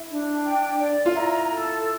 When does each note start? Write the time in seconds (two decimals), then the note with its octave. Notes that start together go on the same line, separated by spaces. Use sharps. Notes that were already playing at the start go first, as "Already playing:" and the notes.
Already playing: E4
0.10 D4
0.45 G5
0.80 D5
1.06 F4
1.16 E4 A#5
1.51 A4